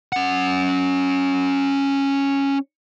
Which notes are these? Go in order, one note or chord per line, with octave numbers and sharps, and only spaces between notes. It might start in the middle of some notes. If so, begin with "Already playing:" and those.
C#4 F#5